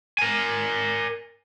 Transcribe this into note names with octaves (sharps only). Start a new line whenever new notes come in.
A#4 G#5